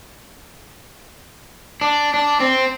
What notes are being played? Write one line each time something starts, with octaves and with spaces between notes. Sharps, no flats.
D4
D4
C4